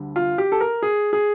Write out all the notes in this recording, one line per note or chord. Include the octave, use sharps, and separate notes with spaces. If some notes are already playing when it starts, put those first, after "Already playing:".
Already playing: D2 D3 G3
F4
G4
A4
A#4
G#4
G#4